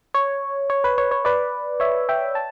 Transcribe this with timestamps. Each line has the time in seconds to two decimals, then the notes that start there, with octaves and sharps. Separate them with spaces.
0.14 C#5
0.70 C#5
0.84 B4
0.98 C#5
1.11 C#5
1.25 B4 D5
1.80 C#5 E5
2.09 E5 G5
2.35 A5